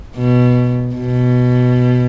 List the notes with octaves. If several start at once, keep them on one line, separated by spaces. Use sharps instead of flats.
B2
B2